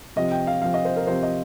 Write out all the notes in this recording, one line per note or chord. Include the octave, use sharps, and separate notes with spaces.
C3 F3 C4 D#5
G5
F5
C3 F3 C4 F5
D#5
C5
A#4
C3 F3 C4 C5
D#5